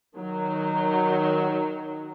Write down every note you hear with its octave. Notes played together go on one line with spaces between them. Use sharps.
D#3 F#3